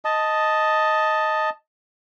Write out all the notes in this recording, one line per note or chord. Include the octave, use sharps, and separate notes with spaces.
D#5 A5